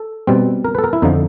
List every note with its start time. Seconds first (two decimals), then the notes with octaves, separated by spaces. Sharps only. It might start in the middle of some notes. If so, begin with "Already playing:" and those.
Already playing: A4
0.27 B2 G3 C4
0.65 A#4
0.75 A4 B4
0.84 A#4
0.93 E4
1.02 F2 D3 F3 D#4